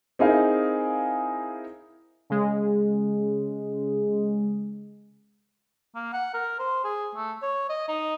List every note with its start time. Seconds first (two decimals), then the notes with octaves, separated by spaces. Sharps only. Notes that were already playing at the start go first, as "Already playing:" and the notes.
0.19 C4 D#4 E4 G#4 A#4 F5
2.30 C#3 G#3
5.95 A#3
6.13 F#5
6.34 A#4
6.59 C5
6.84 G#4
7.15 A3
7.42 C#5
7.69 D#5
7.88 D#4